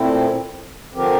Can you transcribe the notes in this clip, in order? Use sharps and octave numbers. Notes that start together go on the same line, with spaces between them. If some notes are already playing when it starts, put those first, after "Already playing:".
Already playing: A#2 A3 C4 E4
D3 F3 C4 G4 A#4